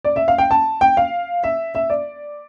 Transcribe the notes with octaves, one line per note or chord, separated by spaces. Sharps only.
D5
E5
F5
G5
A5
G5
F5
E5
E5
D5